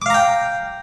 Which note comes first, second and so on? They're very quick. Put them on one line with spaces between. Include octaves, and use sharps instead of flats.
D6 F5 A#5 G5